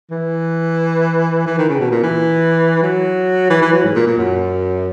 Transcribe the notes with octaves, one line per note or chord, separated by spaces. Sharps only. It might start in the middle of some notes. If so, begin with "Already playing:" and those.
E3
E3
D#3
C#3
B2
A#2
E3
F#3
E3
E3
F#3
G#2
A#2
A#2
F#2